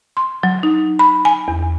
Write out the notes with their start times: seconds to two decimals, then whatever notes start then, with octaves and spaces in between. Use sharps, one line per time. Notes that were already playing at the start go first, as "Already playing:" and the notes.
0.17 C6
0.43 F#3
0.63 D#4
0.99 B5
1.25 G#5
1.48 E2